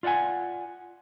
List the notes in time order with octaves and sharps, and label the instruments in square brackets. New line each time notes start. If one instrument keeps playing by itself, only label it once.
[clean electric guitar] F4 D5 D#5 F#5 G#5